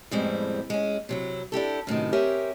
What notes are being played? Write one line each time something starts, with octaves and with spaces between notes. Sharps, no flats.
F2 A2 G3 G#3 B3 C4
G#3 C#4
C3 F#3 E4
D4 E4 G4 A4
F#2 A2 C3 D#3
C4 G4 A#4 C#5 E5 G#5